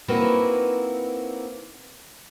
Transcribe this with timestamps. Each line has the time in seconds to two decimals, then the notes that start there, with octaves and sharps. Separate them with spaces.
0.08 A#3 C4 D#4 E4 F#4 B4